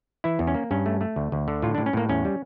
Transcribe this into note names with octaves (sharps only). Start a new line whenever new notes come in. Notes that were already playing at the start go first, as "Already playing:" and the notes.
E3 E4
E2
C#4
A#3
G2 C#4
A3
A3
D2
D2
D3
A2 F4
D4
A2
C#4
A2 A#3
E2 C#4
G3